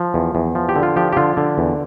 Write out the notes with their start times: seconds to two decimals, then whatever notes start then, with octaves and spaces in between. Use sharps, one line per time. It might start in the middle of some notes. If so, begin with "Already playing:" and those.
Already playing: F3
0.14 E2
0.35 E2
0.55 F3
0.69 G4
0.76 D3
0.83 F4
0.96 F3 G4
1.13 G4
1.17 D3 F4
1.37 D3
1.58 E2